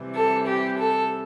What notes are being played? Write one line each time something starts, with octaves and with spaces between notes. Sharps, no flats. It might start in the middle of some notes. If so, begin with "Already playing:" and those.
Already playing: C3 E3 G3
A4
G4
A4